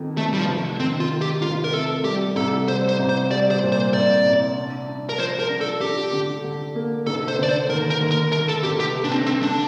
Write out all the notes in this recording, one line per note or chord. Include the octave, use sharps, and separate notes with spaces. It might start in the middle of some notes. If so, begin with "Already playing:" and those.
Already playing: F2 D#3
F1 A3
G3
F3
F1
D#3 C4
F4
D#3
G4
F1 F4
A#4
C3 A4
G3 G4
C2 A4
G3 C5
C5
C2
C5
G3 D5
C5
A#2
C5
C2 D5
C2
D4
D4
A#4
F3 C5
A#4
D4
A4
D4 G4
D3
D3
A#3
F1 A4
C5
D3 D5
C5
D#2 A#4
A#4
D#2
A#4
A3 A#4
A4
F1 G4
G4
A3
D4
C4
A3 C4
D4